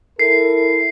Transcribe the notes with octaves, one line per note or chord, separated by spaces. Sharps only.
E4 A4 A#4 C7